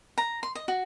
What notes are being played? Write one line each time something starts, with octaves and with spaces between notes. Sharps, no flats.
A#5
C6
D#5
F#4